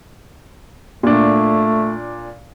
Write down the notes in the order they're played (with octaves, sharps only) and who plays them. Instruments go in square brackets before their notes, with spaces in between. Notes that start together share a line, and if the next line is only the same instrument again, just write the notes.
[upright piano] A#2 D4 [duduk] A3